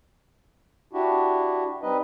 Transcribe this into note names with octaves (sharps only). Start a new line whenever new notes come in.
D4 E4 F#4 G4
G3 C4 D#4 B4 D#5